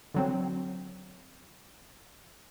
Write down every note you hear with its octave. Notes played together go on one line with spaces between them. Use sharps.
D3 F#3 C4